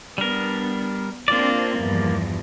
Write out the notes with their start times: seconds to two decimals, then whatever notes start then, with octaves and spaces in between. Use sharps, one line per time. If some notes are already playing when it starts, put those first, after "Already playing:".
0.18 G3 B3 D4 A#4
1.28 A#3 C4 D4 F4 D5
1.77 E2 G2 F3